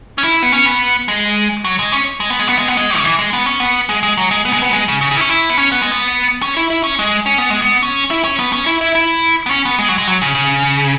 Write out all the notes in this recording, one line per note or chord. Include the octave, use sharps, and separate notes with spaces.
C#4
E4
B3
C#4
B3
G#3
F#3
G#3
C#4
G#3
B3
G#3
B3
G#3
B3
G#3
C#3
E3
G#3
B3
C#4
B3
G#3
G#3
F#3
G#3
B3
G#3
B3
G#3
C#3
C#3
C#3
E4
C#4
E4
B3
C#4
B3
G#3
B3
C#4
E4
E4
C#4
G#3
C#4
B3
G#3
B3
C#4
E4
C#4
B3
C#4
E4
E4
E4
B3
C#4
B3
G#3
F#3
G#3
F#3
C#3
C#3